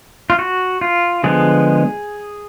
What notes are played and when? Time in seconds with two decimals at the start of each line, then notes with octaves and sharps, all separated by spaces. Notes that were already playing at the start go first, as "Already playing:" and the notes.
0.30 F4
0.39 F#4
0.81 F4
1.24 D3 F3 G#3 B3 G#4